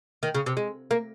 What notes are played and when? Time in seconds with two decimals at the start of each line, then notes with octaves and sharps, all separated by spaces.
0.23 D#3
0.35 C#3
0.46 C3
0.57 G#3
0.91 A#3